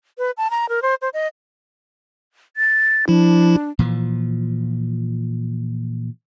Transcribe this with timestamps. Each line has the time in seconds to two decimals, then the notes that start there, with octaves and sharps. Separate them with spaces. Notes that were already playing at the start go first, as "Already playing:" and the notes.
0.18 B4
0.37 A5
0.51 A#5
0.69 A#4
0.82 C5
1.02 C5
1.14 D#5
2.57 A6
3.08 F3 D4 E4
3.79 A#2 E3 F3